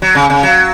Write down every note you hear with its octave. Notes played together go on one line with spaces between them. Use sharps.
F#3
C#3
C#3
F#3